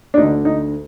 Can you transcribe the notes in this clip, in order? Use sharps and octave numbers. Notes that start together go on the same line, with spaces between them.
D4
D2 D3 D#4
D#4